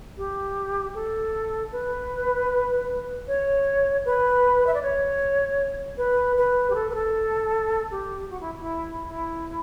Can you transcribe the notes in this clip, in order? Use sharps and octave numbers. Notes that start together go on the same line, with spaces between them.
G4
A4
B4
C#5
B4
E5
D5
C#5
B4
B4
G4
A4
B4
A4
G4
F#4
E4
E4
E4